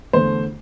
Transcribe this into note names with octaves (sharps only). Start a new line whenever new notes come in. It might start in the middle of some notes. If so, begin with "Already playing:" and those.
E2 D3 A3 C5